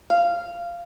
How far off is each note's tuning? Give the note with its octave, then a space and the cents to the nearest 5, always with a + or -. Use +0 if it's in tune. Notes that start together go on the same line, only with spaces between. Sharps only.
F5 -15